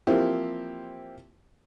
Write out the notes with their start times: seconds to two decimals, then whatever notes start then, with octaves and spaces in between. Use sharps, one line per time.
0.07 E3 F3 A#3 C4 E4 G4